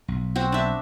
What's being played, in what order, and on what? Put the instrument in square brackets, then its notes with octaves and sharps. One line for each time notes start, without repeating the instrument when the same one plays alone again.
[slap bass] B1
[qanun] C4 F#4
D4 E5